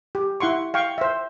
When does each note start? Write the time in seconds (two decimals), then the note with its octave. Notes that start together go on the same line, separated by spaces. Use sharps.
0.15 G4
0.40 E4 F#5 C6 C#6
0.74 F5 G5 C#6
0.98 C5 E5